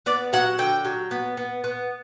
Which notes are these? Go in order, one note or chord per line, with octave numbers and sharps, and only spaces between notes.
B3 D5
F#3 F#5
D3 G5
F#3
B3
B3
B3